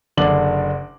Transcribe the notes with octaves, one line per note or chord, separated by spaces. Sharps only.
F#1 D3 D5 D6 F#7